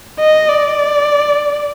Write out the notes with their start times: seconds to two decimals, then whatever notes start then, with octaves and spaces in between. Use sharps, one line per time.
0.20 D#5
0.49 D5